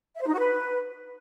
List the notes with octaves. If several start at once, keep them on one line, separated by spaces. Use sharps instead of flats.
E5
C5
D#4
F#4
B4